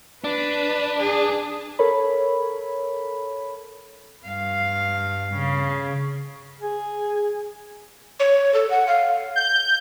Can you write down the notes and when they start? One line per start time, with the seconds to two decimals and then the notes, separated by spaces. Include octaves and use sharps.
0.24 D4 B4
0.99 G#4
1.79 A4 A#4 C#5 B5
4.26 G2 F5
5.34 C#3
6.61 G#4
8.20 C#5
8.54 A4
8.70 F#5
8.87 F5
9.36 G6